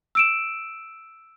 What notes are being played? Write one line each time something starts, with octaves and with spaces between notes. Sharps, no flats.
E6 D7 E7